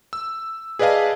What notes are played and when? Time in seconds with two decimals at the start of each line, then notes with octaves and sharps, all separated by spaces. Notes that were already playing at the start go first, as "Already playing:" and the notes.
0.13 E6
0.79 G#4 B4 D5 D#5 F5 A5